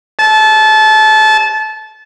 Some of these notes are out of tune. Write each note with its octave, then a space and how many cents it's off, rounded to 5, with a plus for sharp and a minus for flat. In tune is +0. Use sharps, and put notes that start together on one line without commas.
A5 -25